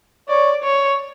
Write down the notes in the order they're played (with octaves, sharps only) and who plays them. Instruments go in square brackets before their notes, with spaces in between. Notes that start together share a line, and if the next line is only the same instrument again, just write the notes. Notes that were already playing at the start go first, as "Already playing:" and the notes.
[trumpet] C#5 [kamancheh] D5
[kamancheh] C#5